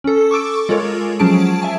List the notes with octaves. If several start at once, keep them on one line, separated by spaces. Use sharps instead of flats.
C#4 A4
C#6 D6 E6 D7
G#3 F4 A4 A#4 C#5
F3 F#3 C#4 G#4 A5 D7
E5 G#5 A5